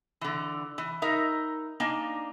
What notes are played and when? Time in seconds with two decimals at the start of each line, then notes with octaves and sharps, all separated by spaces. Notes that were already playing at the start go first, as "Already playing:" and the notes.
0.21 D3 E3
0.78 E3
1.02 D#4 A#4 E5
1.80 A#3 D4 D#4 G#5